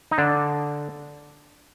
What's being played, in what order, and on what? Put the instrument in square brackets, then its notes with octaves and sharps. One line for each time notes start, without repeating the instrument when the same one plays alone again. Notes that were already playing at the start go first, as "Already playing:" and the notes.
[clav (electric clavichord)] D#4
D3 D4